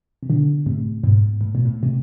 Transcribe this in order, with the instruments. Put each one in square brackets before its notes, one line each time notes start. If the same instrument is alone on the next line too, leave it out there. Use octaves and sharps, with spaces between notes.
[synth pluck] C3
B2 D3
A2 C3
G#2 B2
A2
B2
A2
C3